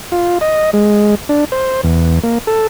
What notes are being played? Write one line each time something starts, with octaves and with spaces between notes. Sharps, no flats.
F4
D#5
G#3
D4
C5
E2
A#3
A4